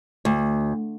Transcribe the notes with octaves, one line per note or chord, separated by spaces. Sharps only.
D2